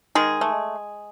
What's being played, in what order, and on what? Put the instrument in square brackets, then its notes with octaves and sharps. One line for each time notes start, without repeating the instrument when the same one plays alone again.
[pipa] D#3 G#3 G#4
A3